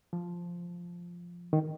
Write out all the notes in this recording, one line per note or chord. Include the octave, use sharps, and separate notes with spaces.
F3
D#3